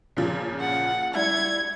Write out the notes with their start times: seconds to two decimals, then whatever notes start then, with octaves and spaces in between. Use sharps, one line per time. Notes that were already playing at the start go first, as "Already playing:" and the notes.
0.17 A#2 C#3 F3
0.60 F#5
1.14 G3 E4 G#6